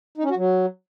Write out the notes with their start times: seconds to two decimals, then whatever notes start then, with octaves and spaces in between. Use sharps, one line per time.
0.18 D#4
0.24 C#4
0.30 F#4
0.36 F#3